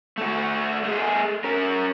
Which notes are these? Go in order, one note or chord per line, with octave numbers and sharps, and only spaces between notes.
A3 F#4
A3 G#4
C#4 A#4